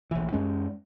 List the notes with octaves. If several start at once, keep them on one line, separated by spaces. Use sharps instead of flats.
A#1 E3
F#2 G#3 C#4